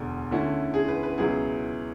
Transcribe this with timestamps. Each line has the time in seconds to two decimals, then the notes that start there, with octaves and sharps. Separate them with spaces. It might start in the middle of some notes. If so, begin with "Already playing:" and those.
Already playing: E1 D2 D3
0.31 D2 D3 A3 C#4 E4
0.74 G#4
0.88 B4
1.03 B4
1.18 C#2 B2 F#3 B3 E4 G#4